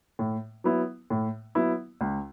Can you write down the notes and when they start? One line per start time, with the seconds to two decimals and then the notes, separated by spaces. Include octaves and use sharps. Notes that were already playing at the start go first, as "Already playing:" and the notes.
0.19 A2
0.64 F#3 B3 E4
1.10 A2
1.55 F#3 B3 E4
2.01 C#2